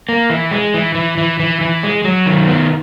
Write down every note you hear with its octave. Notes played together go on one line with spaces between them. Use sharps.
A#3
E3
G#3
E3
E3
E3
E3
E3
G#3
F#3
D#3
B3